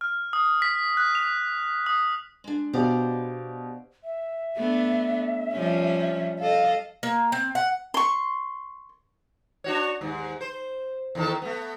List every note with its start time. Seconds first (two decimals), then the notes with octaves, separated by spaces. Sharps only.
0.01 F6
0.33 D#6
0.62 B6
0.97 F#6
1.15 F7
1.86 D#6
2.44 G#3 D4
2.73 B2 G4 C5 D5 F5
4.04 E5
4.56 A3 B3 D4
5.52 F3 G3 C#4
6.39 A4 D#5 F5
7.03 A#3
7.32 C4
7.55 F#5
7.94 C6 C#6
9.64 D4 F#4 C#5
10.01 D#2 G#2
10.41 C5
11.15 E2 D#3 A4
11.42 A3 B3